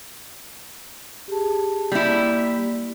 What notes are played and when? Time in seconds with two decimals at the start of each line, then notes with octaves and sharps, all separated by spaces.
1.28 G4 G#4 A5
1.92 G3 A#3 E4